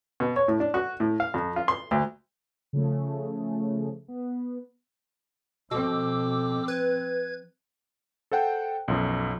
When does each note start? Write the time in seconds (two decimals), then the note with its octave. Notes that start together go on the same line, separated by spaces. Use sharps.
0.20 B2
0.36 C#5
0.48 A2
0.60 D4
0.74 F#4
1.00 A2
1.20 F5
1.34 F2
1.56 F4
1.68 C6
1.91 D2
2.73 C#3 F3 A3
4.08 B3
5.71 B2 F3 C4 A4 D6 E6
6.68 B4 G#6
8.31 A4 C5 F#5 G5
8.88 B1 F#2 F3